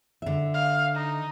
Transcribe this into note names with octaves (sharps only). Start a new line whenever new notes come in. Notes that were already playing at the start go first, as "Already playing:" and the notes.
D3 E5
F5
D#4